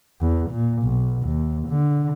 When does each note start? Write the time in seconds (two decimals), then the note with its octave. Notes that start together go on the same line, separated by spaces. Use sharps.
0.21 E2
0.51 A#2
0.83 B1
1.23 D#2
1.69 D3